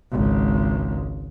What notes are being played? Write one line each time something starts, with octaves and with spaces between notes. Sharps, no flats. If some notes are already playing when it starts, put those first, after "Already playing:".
G#1 C#2